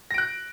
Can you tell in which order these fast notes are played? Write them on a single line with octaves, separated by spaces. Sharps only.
A#6 D7 F#6